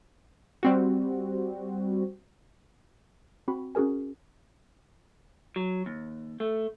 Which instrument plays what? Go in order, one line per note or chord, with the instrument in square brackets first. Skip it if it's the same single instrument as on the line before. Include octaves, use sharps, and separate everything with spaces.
[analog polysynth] G3 C4 F#4
[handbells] C4 F#4 B5
C#4 F#4 G#4 A#4 G#5
[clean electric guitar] F#3
D#2
A3